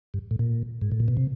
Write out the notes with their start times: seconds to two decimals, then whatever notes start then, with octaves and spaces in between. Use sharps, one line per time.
0.14 G2
0.31 A2
0.39 A#2
0.82 G#2
0.92 A2
1.00 A#2
1.08 B2
1.17 C3